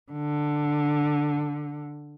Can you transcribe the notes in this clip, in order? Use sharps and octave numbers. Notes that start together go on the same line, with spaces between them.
D3